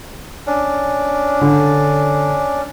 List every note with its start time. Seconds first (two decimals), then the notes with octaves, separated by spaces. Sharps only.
0.47 C#4 D4
1.41 D3